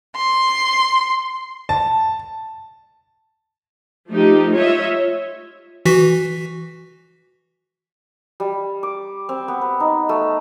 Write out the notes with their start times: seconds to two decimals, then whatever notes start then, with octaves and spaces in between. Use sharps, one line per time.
0.15 C6
1.69 A5
4.10 F3 A3 D#4 G4
4.54 F4 C#5 D#5 E5
5.85 E3 F#4 B6
8.40 G3
8.83 D6
9.29 C4
9.48 B3
9.61 B4
9.80 D#4
10.09 A3